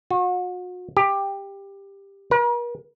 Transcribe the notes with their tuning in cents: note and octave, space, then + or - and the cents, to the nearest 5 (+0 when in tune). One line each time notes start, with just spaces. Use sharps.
F#4 -40
G4 +15
A#4 +45